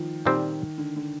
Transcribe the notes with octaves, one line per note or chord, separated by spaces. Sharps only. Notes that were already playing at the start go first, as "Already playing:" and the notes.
Already playing: D#3 F3
A#2 D#3 G3 C4
D3
D3